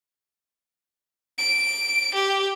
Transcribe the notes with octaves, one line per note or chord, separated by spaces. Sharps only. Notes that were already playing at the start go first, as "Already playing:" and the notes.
D7
G4